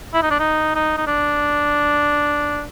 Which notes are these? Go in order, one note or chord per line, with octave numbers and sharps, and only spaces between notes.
E4
D#4
D4
D#4
D#4
D#4
D4